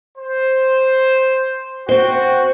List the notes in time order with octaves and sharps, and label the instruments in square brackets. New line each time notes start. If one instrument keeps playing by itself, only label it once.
[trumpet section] C5
[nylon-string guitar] C4 C5 [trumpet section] F#4 G5